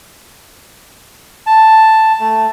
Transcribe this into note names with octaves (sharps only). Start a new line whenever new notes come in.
A5
A3